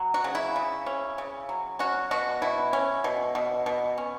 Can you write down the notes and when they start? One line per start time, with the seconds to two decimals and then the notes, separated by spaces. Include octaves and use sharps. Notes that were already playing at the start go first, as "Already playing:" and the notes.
Already playing: F#3
0.14 F#4
0.24 C#3
0.35 E4
0.56 C#3
0.86 C#4
1.18 C#3
1.49 F#3
1.79 C#4 F#4
2.11 B2 F#4
2.42 B2 E4
2.73 C#4
3.04 B2
3.35 B2
3.66 B2
3.98 C#4